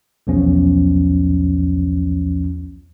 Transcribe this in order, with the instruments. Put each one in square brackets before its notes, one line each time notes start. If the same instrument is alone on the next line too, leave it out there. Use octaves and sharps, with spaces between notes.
[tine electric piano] B1 E2 F3 C#4